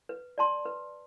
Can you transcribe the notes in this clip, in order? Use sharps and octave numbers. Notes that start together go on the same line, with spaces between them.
B4
D5 A5 C6
B4